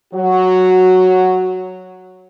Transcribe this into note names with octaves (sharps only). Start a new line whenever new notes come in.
F#3 F#4